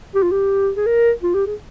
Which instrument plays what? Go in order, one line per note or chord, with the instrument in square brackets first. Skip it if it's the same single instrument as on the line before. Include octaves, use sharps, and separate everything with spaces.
[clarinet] G4
F4
G4
G#4
A#4
F4
G4
G#4